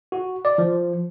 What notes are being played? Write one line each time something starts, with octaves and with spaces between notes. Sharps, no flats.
F#4
D5
F3